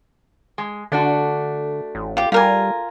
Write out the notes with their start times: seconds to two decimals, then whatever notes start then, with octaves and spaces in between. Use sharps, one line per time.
0.58 G#3
0.92 D3 A3 D4 F#4
1.95 A1
2.17 F4 G4
2.32 G3 F4 A#4 G#5